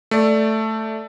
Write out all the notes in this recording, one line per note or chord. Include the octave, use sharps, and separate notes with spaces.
A3 D5